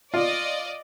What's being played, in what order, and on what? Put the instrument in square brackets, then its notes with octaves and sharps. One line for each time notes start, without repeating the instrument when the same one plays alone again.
[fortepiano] F4 [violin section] D5 D#5